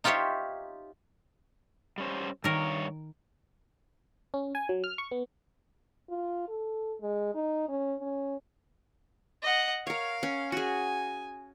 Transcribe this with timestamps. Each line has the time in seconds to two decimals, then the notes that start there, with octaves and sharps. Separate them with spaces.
0.04 D#4 F4 G4 C5 C#5 E5
1.98 G3 C#4 C5
2.44 G2 D#3 A#4 C#5
4.34 C#4
4.55 G#5
4.69 F#3
4.84 F6
4.98 C#6
5.11 B3
6.09 F4
6.49 A4
7.01 G#3
7.35 D#4
7.69 C#4
7.99 C#4
9.42 D#5 F#5
9.87 A#4 C#5 F5
10.23 C#4
10.52 F#4 G#4 G#5